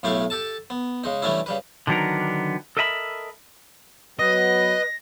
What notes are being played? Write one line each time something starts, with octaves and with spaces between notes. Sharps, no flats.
B1 A2 A3 E4 G4 F5
G4 A4 A5
B3
C#3 G#3 D#4
E3 G3 A3 C#4 D4 E4
C#3 G3 B4
D3 D#3 F#3 B3 D4 A#4
A4 A#4 D#5 E5 G#5 B5
F#3 B3 B4 D#5 A#6